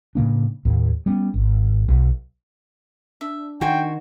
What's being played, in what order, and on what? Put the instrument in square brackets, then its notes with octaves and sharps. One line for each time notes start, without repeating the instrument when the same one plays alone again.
[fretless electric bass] A2 C#3 A#3 D4
D#2 A2
G3 B3 C#4
G#1
B1
[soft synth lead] D4 [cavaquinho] E5
[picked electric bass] D#3 [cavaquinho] F#4 C5 G#5 [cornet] G5